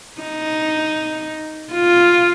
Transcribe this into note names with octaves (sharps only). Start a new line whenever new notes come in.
D#4
F4